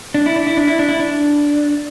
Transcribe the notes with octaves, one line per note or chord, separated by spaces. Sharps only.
D4
E4
D4
E4
D4
E4
D4
E4
D4